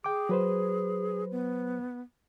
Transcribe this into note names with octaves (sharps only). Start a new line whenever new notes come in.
G#4 G5 D6
F#3 B4 C5
B3